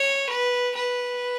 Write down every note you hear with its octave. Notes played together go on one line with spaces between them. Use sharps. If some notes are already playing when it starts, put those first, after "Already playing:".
Already playing: C#5
B4
B4